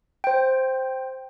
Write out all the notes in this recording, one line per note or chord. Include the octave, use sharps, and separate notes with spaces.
C5 G5